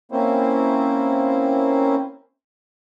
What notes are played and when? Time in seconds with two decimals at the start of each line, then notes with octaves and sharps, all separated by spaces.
0.12 A#3 C4 C#4 E4 C5